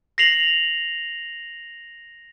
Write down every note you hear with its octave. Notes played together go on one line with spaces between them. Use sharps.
A#6 C7 F7 F#7